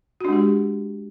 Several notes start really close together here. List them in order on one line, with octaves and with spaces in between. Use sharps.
F#4 D4 G#3 G4